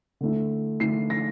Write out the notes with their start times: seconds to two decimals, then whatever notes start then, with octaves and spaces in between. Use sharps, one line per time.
0.21 D3 A3 E4
0.80 D3 A3 E4 C7
1.10 A#6